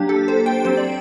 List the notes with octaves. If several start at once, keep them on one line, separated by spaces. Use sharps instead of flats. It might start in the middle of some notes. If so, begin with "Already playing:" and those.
Already playing: F#3 A#3 D4 G4
A4
C5
G5
F#3 C4 C5
D5